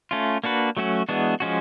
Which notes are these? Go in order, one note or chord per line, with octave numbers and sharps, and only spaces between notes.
A3 C#4 F4
A#3 D4 F#4 B4
F#3 A3 C#4 F#4
E3 G#3 B3 D4 F#4
F3 G#3 C#4 F#4